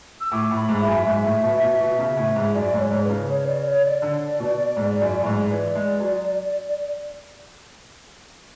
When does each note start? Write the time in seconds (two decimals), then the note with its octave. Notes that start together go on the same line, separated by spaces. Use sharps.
0.20 E6
0.32 A2 D6
0.51 A2
0.56 B5
0.69 G#2
0.81 E5
0.87 F#2
1.06 G#2 E5
1.24 A2
1.43 B2
1.62 B2
1.80 B2
1.99 C#3
2.17 A2
2.36 G#2
2.55 F#2 D5
2.73 G#2
2.79 C#5
2.91 G#2
3.04 B4
3.10 C#3
3.29 C#5
3.48 D5
3.65 C#5
3.85 D5
4.02 D3
4.40 B2
4.77 G#2
5.01 F#2
5.22 A2
5.26 G#2
5.51 E3 D5
5.75 G#3
6.00 F#3